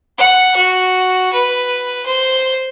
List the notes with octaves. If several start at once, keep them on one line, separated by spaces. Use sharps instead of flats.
F#5
F#4
B4
C5